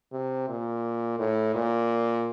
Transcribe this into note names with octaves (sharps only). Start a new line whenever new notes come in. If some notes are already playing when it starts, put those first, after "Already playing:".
C3
A#2
A2
A#2